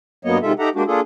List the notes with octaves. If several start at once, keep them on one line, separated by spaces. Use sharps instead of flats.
G2 F#3 A#3 B3 C#5 D#5
C3 D#3 G#3 F4 A4 E5
D#4 G4 A4 E5 F#5 A#5
G#3 A#3 D4 F#4 G4
A#3 D4 F4 G#4 A4